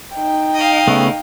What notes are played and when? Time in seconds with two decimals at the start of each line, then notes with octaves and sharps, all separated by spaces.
0.14 D#4 G5
0.54 D#5 F5
0.88 C#3 A3 B3